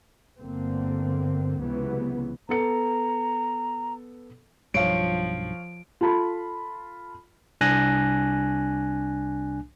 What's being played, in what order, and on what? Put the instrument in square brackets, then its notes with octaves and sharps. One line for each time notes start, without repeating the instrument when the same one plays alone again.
[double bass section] G1 D3 A#3 C4
C#2 C3 E3 F#3 B3
[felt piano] B3 A4 C#7 [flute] A#5
[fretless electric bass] B1 G2 [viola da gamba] F3 [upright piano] C#5 F5 [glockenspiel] D7
[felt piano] F4 A4 A5 B5
[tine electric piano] C2 D4 G#5 F#6 A#6